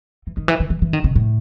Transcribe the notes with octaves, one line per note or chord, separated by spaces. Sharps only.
E3
D#3
E3
D#3
E3
E3
D#3
C#3
A2